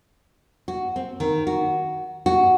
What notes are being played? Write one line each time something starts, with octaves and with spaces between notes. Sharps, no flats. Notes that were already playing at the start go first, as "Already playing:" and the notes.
F#4
C4
D#3
F#4
F#4